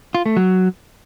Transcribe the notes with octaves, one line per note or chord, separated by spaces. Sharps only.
F4
A3
F#3